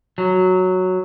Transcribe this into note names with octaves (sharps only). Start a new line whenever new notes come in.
F#3